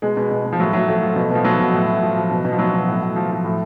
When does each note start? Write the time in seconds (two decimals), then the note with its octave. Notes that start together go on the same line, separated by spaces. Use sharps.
0.02 B2 G#3
0.17 B2
0.31 B2
0.46 B2
0.53 F3
0.60 A2 F#3
0.73 A2 F#3
0.88 F3 A3
1.03 F3
1.16 B2
1.30 B2 F3
1.44 B2 F#3
1.60 B2
1.74 A2
1.88 A2
2.02 F3
2.17 F3
2.31 B2
2.45 B2
2.52 F3
2.59 B2 F#3
2.74 B2
2.88 A2
3.03 A2
3.16 F3
3.31 F3
3.45 A2